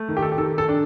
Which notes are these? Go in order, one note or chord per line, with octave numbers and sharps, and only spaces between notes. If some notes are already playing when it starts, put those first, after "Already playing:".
Already playing: A3
D#3
G4
A4
G4
D#3 A4
A4
D4